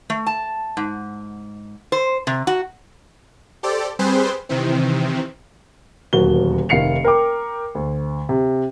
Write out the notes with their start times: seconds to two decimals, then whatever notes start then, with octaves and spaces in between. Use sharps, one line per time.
0.10 A3
0.26 A5
0.77 G#2
1.92 C5
2.27 C3
2.47 F#4
3.63 G4 A4 C5 D5
3.99 G3 C4 G#4 B4 C5 C6
4.49 C3 D#3 E3 C4
6.13 D#1 D2 F#3 F#4 A#4 G7
6.69 F1 D#3 F5 C7 C#7 F7
7.04 A#4 G5 D6
7.75 D2
8.29 C3